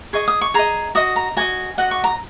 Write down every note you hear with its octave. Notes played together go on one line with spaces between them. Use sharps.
G#4 D#5 C#6
D#6
C#6
G#4 D#5 A#5
F#4 D#5 D#6
A#5
F#4 D#5 G#5
F#4 D#5 F#5
C#6
A#5